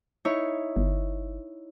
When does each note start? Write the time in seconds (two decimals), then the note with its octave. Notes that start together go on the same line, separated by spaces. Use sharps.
0.25 D#4 E4 C#5
0.76 G1